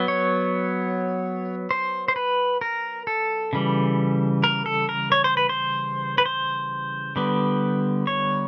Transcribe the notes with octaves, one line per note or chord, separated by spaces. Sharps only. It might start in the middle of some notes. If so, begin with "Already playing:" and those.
Already playing: F#3 B3
C#5
C5
C5
B4
A#4
A4
C#3 E3 G3
A#4
A4
A#4
C#5
C5
B4
C5
B4
C5
D3 G3 B3
C#5